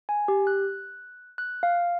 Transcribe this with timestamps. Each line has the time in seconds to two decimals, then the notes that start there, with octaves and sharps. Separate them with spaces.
0.09 G#5
0.28 G4
0.47 F#6
1.38 F#6
1.63 F5